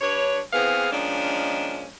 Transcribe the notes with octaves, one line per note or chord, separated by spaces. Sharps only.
G2 D4 B4 C#5
E2 E3 B3 C4 G#4 F5
D#3 F3 G#3 A#3 C#4 D4